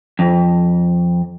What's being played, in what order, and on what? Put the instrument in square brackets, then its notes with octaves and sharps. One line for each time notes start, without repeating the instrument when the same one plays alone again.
[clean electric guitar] F2